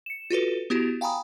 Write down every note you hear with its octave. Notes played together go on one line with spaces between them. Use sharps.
C#7 E7
F4 F#4 A4 B4
B3 E4 F#4 G4
F5 G5 G#5 A#5 B5 D#6